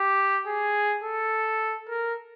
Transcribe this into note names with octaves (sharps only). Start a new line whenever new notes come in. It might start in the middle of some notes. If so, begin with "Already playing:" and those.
Already playing: G4
G#4
A4
A#4